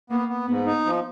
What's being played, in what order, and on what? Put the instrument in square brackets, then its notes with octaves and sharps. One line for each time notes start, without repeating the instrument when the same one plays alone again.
[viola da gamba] A#3 [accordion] B3
[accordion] B3
[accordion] G#2 [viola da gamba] B3
[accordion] D#4
F3